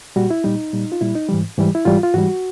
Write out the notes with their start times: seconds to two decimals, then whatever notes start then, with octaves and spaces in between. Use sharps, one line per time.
0.16 A#2 G3 F#4
0.30 E4
0.44 A#2 G3 D#4
0.73 A#2 G3
0.92 F4
1.01 A#2 G3 E4
1.15 D#4
1.29 G#2 E3 G3
1.57 G#2 E3 G3
1.75 E4
1.85 G#2 E3 G3 F4
2.03 F4
2.14 G#2 E3 G3 F#4